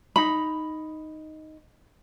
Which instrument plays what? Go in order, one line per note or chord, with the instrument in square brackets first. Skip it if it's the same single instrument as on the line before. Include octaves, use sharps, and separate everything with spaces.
[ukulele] D#4 B5